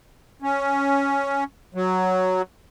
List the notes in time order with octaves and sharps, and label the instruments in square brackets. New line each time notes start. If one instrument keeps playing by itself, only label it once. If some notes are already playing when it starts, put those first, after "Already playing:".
[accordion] C#4
F#3